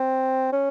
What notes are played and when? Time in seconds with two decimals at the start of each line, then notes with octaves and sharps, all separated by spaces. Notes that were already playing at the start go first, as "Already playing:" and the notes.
Already playing: C4
0.52 C#4